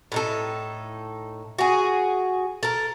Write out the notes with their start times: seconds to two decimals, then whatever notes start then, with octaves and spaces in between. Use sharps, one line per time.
0.12 A2 D#4 A4
1.58 F#4 G#4
2.63 A4 A#4